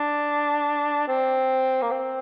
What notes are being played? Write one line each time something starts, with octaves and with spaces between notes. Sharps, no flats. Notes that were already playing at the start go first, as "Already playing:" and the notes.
Already playing: D4
C4
A#3
C4